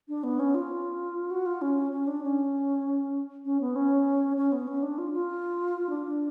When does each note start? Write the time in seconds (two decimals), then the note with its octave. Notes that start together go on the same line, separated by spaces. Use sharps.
0.08 D4
0.23 B3
0.39 C#4
0.54 F4
1.31 F#4
1.46 F4
1.62 C#4
1.92 C#4
2.07 D4
2.23 C#4
3.45 C#4
3.61 B3
3.76 C#4
4.37 C#4
4.52 B3
4.67 C#4
4.83 D4
4.98 F4
5.13 F4
5.90 D4